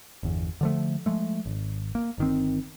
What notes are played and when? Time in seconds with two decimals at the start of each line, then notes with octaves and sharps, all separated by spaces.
0.23 G1 E2
0.61 D3 F3 A3
1.06 F3 G#3 A3
1.46 G#1
1.95 A#3
2.18 G1 D#3 C4